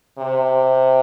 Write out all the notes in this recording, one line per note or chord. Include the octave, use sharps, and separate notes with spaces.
C3